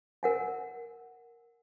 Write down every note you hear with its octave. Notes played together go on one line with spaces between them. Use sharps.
A#4 F#5 G#5